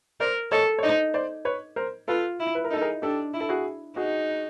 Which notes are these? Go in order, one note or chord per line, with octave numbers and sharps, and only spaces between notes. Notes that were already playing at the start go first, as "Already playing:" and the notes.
A#4 C5 D5
A4 C#5 D#5
C#5
D#4 C5 D5
C5 D5
B4 C#5
A#4 C5
F4 A4 B4
E4
B4
A#4
D#4 A4
G#4 A#4
D4 G4 A4
E4
A4
F#4 G#4
D#4 F#4 G#4